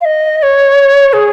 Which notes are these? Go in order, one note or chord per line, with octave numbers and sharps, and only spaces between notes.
F5
D#5
D#5
C#5
G#4